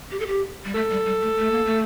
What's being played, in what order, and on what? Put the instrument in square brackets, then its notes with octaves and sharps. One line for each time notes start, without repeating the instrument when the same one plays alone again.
[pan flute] G4
A4
G4
G3
[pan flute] A3 [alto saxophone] A4
[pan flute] G3
G3
A3
A3
A#3
A3